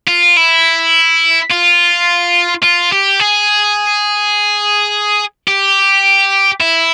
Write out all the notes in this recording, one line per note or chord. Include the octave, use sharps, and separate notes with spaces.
F4
E4
F4
F4
G4
G#4
G4
E4